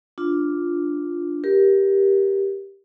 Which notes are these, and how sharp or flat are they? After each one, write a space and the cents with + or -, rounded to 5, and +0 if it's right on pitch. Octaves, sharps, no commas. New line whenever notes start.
D4 +0 F4 +0
G4 +0 A#4 +20